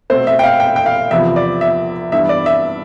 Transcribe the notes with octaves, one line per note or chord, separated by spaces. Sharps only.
B2 A3 C4 C5
E5
G5
F5
G5
G5
F5
E2 C3 F3 B3 E5
D5
E5
G2 E3 G3 B3 E5
D5
E5